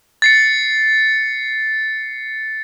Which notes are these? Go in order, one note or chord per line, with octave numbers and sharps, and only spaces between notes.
A6 C7 C#7